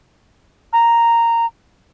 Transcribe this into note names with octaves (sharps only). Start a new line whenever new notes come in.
A#5